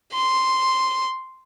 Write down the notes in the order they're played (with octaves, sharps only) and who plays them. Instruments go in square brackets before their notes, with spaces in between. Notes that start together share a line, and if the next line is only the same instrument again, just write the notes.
[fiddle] C6